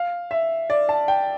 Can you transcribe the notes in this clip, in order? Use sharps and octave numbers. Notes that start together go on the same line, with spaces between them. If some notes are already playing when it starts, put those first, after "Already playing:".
Already playing: F5
E5
D5
A5
G5